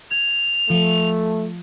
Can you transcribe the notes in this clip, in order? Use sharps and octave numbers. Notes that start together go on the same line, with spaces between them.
G#6 F7
F3 A3